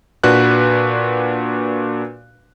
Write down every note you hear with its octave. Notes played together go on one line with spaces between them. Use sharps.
A#2 D4 F#4 B4 F#6